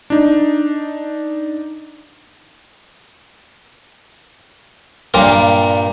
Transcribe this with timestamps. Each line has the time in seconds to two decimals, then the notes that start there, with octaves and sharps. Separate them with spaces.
0.10 D4 D#4
5.14 G2 A#2 G3 F4 A#4 A#5